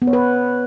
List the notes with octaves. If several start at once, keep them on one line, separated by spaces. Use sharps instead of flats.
B3
C#5
B4